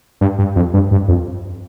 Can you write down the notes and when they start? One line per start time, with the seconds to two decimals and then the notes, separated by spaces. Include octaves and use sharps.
0.21 G2
0.39 G2
0.56 F2
0.74 G2
0.91 G2
1.08 F2